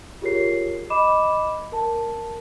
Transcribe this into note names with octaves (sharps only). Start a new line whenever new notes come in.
F4 G4 G#4 A#4 C#5 C7
D#5 B5 D6 E7
A#4 A5